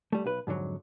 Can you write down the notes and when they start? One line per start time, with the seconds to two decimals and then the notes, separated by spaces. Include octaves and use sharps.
0.12 G3 A3
0.24 B1 B4
0.47 F2 G#2 D3 F#3